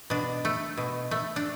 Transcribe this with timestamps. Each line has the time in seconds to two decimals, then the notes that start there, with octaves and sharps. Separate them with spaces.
0.10 B2 D4
0.45 A3
0.77 B2
1.11 A3
1.36 D4